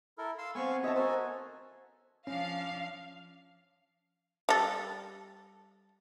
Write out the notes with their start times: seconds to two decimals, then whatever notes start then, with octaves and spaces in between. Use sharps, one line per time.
0.18 E4 A4 A#4
0.38 F5 C6 E6
0.55 A3 B3 C4 F5 G#5 C#6
0.84 C#5 D#5 E5 A5
0.96 F#4 A4 A#4 C5 G#5
2.27 F3 C#4 D4 F5
4.49 G3 A4